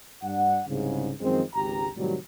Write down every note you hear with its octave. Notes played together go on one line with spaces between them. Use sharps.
G2 D4 F#5
C2 G#2 C#3
F#2 D#3 F3 G#3 C4
G#1 C#2 G4 A#5
A2 C3 D#3 F#3 G3